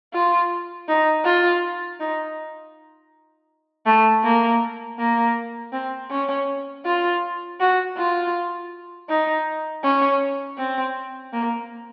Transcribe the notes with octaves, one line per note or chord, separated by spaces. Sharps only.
F4
D#4
F4
D#4
A3
A#3
A#3
C4
C#4
F4
F#4
F4
D#4
C#4
C4
A#3